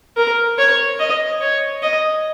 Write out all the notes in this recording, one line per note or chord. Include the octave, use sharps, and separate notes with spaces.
A#4
C#5
D#5
C#5
D#5